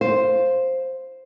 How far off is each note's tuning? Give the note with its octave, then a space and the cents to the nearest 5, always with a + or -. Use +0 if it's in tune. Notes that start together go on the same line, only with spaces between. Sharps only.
C5 +0 F5 +0